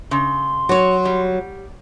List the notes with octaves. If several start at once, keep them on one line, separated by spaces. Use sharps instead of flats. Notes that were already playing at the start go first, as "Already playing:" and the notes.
C#3 C6
F#3 F#4 C#5
G3